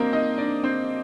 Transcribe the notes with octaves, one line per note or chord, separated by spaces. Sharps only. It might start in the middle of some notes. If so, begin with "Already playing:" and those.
Already playing: A#3 C4 D4 A#4 C5 D#5
D#4 D#5
D4 D5
C4 C5